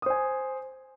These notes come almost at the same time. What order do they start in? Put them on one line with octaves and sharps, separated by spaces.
D#6 C5 G#5